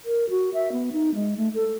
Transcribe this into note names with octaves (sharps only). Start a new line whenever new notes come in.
A#4
F#4
E5
B3
D#4
G#3
A3
A4